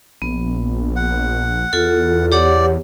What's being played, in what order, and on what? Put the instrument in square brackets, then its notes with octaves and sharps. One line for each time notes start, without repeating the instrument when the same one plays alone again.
[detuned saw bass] A#1 [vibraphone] B3
[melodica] F#5
[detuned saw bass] E2 [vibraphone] F4 A4
[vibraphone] G4 C#5 F#5 [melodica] D5